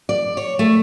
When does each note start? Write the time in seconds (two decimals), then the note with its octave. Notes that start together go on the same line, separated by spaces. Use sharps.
0.09 D5
0.37 C#5
0.59 A3